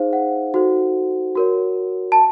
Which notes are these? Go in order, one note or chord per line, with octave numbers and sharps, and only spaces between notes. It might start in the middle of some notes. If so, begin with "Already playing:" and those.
Already playing: D#4 G#4 C5 F5
F#5
D#4 F#4 A4 C5
F#4 A#4 C#5
A5